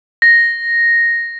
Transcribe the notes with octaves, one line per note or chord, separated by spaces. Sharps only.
A#6